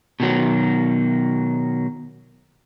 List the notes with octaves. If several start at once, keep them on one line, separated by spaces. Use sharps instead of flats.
B2 D#3 F#3